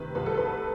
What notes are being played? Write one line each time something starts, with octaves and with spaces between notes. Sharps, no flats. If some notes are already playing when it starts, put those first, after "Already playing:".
Already playing: C3 D#3 B4
C2 B4
A4
B4